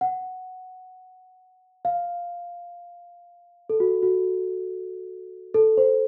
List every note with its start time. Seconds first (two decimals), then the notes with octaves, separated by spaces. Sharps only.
0.01 F#5
1.85 F5
3.70 A4
3.80 F#4
4.03 F#4
5.54 A4
5.77 C5